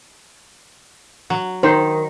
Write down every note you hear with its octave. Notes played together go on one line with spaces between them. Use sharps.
F#3
D#3 D#4 C5